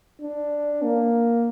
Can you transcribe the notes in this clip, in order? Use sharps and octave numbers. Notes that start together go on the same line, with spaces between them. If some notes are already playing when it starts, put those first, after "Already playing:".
D4
A#3